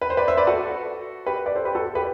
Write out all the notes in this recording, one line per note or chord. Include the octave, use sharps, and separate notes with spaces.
B4
C5
B4 D5
C5 E5
B4 D5
F#4 A4
G4 B4
B4 D5
A4 C5
G4 B4
F#4 A4
G4 B4